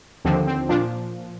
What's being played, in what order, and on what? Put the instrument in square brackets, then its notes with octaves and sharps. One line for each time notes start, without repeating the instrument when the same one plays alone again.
[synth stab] D#2 D3 F3 C4
C4
A#2 F3 D4